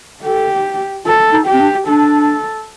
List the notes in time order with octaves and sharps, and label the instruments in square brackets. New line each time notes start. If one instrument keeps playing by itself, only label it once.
[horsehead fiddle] G4 [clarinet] A4
[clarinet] F4 [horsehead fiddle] A4
[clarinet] D#4
[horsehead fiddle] G4
[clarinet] C4
D4
[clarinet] D4 [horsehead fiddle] A4